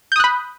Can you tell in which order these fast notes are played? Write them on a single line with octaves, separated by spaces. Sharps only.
G6 D#6 F#6 B5